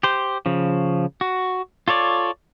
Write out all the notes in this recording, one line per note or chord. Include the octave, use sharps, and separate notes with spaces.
G4 C5
C#3 F3
F#4
F4 A4 C#5 D5